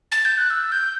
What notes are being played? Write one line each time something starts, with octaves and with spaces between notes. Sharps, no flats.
A6
G6
F#6
E6
G6